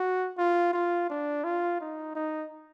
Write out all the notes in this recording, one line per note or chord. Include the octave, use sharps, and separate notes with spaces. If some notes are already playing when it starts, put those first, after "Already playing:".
Already playing: F#4
F4
F4
D4
F4
D#4
D#4